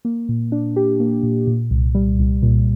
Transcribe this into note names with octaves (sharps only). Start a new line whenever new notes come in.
A#3
A#2
D4
G4
A#3
A#2
A#2
C2
G3
C2
A#2